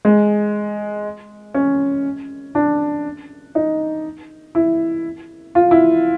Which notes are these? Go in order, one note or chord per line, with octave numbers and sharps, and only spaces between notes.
G#3
C#4
D4
D#4
E4
F4
E4